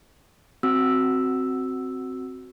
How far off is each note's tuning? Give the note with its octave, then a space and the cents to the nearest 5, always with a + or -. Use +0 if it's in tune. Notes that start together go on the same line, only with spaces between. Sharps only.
C4 +0 F#4 +0 E6 +0